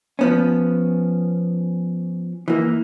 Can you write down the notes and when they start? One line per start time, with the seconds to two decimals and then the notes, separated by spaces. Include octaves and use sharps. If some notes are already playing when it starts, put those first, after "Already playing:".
0.19 F3 B3 C#4
2.48 E3 A#3